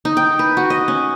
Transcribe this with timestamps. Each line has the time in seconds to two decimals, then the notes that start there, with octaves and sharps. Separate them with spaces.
0.05 D#4
0.17 G5
0.39 B4
0.57 F#4
0.70 D#5
0.88 C#4